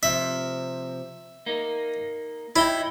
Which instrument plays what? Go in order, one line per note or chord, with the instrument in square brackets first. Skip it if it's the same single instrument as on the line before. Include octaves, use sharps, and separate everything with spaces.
[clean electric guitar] C3 F3 [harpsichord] E5
[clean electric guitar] A#3 D#4
[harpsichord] E4 [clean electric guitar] C#5 D#5 G5